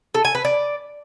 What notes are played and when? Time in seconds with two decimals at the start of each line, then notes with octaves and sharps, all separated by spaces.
0.14 A4
0.25 G#5
0.35 B4
0.45 D5